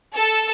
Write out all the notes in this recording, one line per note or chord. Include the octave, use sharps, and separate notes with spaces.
A4